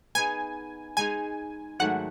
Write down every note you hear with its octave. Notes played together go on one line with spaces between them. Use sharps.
B3 D#4 G#4 G#5
G#3 D#4 G#4 G#5
G#2 D#3 F#3 A3 F#5